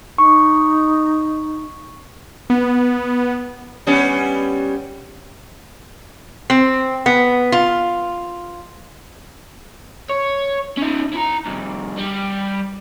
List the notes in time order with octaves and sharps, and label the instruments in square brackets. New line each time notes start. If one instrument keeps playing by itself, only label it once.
[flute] D#4 [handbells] C#6
[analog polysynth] B3
[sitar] G3 B3 C#4
[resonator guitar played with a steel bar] C4
B3
F4
[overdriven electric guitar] C#5
C#4 D#4
E4 A#5
C2 F2
G3